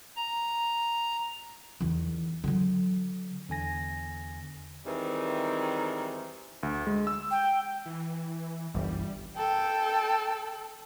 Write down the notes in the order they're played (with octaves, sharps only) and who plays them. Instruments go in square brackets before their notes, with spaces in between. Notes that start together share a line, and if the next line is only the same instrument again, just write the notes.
[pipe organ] A#5
[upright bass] E2 D#3
D3 F#3
[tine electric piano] E2 D3 G#5 A#6
[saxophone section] D#3 E3 G3 G#3 C4
[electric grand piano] D2
G#3
E6
[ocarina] G5
[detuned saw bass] E3
[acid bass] G1 [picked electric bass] C2 F#2 E3 [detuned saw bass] G3
[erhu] A4 [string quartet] G5